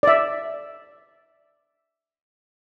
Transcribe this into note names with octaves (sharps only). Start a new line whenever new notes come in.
D5 E5